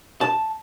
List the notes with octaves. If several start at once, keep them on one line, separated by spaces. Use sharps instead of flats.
A5